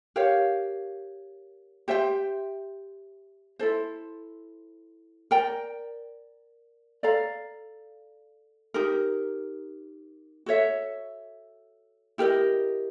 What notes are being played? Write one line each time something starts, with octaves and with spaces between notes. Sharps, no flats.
G4 A#4 C#5 F5
G4 C5 E5 G5
E4 A4 C5
A#4 D5 G5 A#5
A4 D5 F5 A#5
D#4 G4 A#4
F#4 A4 C#5 E5
E4 G4 A#4 D#5